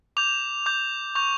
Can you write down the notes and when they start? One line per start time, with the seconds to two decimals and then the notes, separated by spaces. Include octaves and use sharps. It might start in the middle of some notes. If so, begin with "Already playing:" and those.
0.17 D6 G6 F7
0.66 D6 G6
1.15 C#6 G6 F7